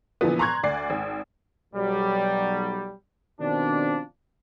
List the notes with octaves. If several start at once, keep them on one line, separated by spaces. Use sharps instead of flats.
A#2 D3 E3 F3 B3
A#5 C6 C#6 F#6 G#6
D2 D5 C7
G#1
B1 F#3 G3
B2 D#3 F3 C4 D4